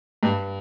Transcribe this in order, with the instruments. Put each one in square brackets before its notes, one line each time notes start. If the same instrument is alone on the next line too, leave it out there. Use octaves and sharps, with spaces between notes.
[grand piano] G2